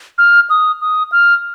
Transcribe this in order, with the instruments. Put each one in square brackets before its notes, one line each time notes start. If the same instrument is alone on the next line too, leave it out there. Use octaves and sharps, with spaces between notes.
[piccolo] F6
D#6
D#6
F6